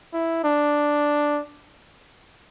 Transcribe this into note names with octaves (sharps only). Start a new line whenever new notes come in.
E4
D4